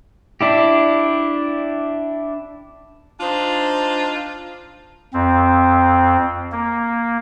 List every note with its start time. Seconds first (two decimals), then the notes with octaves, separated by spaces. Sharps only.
0.41 D4 E4 G4
3.20 D4 D#4 F4 C5
5.14 F2 C4
6.52 A#3